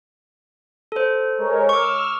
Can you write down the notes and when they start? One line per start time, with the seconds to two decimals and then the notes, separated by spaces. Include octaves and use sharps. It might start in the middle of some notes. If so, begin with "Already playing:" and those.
0.92 A4 C5
1.38 G#3 A#4 C#5
1.69 C#6 D6 E6 F6